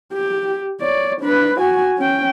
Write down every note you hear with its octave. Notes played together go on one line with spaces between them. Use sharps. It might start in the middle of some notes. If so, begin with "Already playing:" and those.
G4
C#5 D5
D4 B4
F#4 G#5
C#4 G5